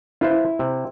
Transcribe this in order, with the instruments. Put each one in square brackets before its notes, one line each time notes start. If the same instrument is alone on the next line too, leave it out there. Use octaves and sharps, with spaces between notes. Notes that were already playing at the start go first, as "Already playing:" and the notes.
[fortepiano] E4 [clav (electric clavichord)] F4 B4 C5
[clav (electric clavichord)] C3